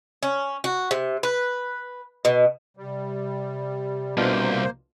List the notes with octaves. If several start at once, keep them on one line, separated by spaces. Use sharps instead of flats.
C#4
F#4
C3
B4
B2
C3 G3
C2 B2 A#3 D4 F4 C5